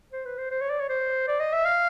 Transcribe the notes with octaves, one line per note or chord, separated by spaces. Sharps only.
C5
B4
C5
C5
C#5
D5
C#5
C5
D5
D#5
E5
F5